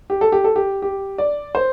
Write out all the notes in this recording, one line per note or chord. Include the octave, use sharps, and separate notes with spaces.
G4
A4
G4
A4
G4
G4
D5
C5